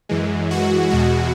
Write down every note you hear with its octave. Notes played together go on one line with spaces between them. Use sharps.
F#2 E3 G#3
F#4
E2 B2 G#3 F#4